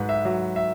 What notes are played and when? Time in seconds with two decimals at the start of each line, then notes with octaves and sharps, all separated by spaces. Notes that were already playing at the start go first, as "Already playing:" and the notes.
Already playing: G#2 F#3 B4
0.09 E5
0.25 F#3
0.56 E5